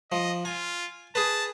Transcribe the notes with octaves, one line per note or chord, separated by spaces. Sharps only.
F3 D#5
F4 G#5
G#4 B4 A5